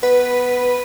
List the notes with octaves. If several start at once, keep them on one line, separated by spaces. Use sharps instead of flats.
B3 B4